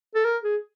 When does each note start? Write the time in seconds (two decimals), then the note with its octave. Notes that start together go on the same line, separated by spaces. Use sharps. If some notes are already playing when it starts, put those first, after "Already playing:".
0.15 A4
0.25 A#4
0.44 G#4